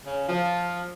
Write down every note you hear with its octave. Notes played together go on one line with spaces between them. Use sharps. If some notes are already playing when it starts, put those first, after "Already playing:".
C#3
F3